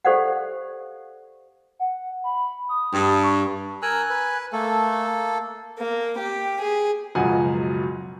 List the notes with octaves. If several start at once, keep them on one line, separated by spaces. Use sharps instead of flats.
G4 A4 C5 D5 F5 F#5
F#5
B5
D#6
G2
C#6
A#4 G#5 A#5 E6 F#6
B4
A3 A#3 A4
A#3
G4
G#4
C#2 F#2 B2 F3 F#5 G#5